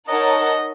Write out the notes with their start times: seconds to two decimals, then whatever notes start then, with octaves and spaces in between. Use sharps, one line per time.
0.08 D#4 A#4 C#5 D#5 F#5 A5